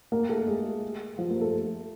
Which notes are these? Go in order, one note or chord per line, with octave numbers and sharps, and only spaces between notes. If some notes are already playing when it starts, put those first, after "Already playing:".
A#3 A#4
A3 A4
G#3 G#4
F3 F4
A#3 A#4
A3 A4